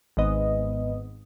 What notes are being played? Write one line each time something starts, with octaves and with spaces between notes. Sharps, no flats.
G#1 G#2 B3 D#5